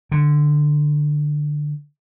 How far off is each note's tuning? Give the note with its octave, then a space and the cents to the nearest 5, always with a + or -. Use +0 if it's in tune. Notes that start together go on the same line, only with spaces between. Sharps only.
D3 +15